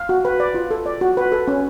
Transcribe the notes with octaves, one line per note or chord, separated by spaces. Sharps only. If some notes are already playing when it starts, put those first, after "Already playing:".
Already playing: F5
F#4
B4
D5
F4
A4
D5
F#4
B4
A4
C#4